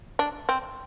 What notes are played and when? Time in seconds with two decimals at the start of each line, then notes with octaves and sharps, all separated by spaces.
0.19 D4
0.49 C4